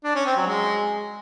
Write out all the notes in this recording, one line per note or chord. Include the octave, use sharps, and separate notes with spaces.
D4
C#4
C4
F#3
G#3